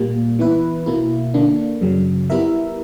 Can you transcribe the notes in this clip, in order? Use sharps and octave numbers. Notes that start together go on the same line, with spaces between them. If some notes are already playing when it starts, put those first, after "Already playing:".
Already playing: A#2 G3 A#3
E3 B3 E4 B4
B2 A#3 E4
D3 A#3 D4
F#2 C#3 F#3
G3 B3 E4 A#4 E5